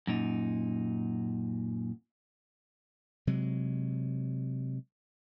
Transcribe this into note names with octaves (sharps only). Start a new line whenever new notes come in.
F#2 A#2 D#4
C3 F#3 G#3